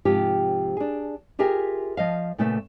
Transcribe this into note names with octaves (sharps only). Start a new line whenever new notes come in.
G#2 C3 F3 F4 G4
D4 G#4
F4 G4 G#4 A#4 E5
F3 D#5 F5
A#2 C#3 A3 B3 E5